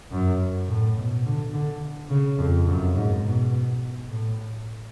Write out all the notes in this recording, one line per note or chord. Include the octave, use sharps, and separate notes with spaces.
F#2
A2
B2
D3
D3
C#3
F2
F#2
G#2
B2
A2